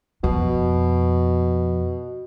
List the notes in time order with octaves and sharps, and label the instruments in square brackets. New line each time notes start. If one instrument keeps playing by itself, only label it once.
[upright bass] F2 [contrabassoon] B2